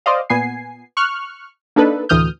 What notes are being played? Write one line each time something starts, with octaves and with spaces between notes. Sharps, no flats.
C5 D5 D#5 F5
A#2 B3 G#5 C7
C#6 F6 F#6
A#3 D4 D#4 A4 B4
D2 A2 E3 D#6 F6 G6